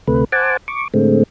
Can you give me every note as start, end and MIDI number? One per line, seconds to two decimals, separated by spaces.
0.08 0.24 38
0.08 0.24 48
0.08 0.24 57
0.08 0.24 71
0.32 0.57 72
0.32 0.57 78
0.32 0.57 80
0.32 0.57 81
0.32 0.57 86
0.68 0.88 85
0.68 0.88 86
0.94 1.23 45
0.94 1.23 50
0.94 1.23 56
0.94 1.23 57
0.94 1.23 60